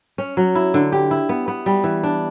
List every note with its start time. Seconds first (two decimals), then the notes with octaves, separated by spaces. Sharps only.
0.18 C#4
0.37 F#3
0.55 E4
0.74 D3
0.92 G4
1.11 E4
1.29 B3
1.48 B3
1.66 G3
1.84 E3
2.03 D4